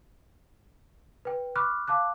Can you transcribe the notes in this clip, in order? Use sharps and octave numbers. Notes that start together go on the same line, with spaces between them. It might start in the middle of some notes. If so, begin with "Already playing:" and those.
B4 G5
B5 C#6 D6 F6 F#6
F5 A5 D6 F#6